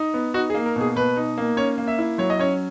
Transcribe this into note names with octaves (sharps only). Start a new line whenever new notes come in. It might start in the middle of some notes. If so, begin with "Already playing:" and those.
Already playing: D#4
B3
D#4 F#4
G#4
A#3
A#4
B2 G#4
B2 B4
D#4
A#3
C#4 C#5
A#3
E5
E4
F#3 C#5
D#5
C#4 C#5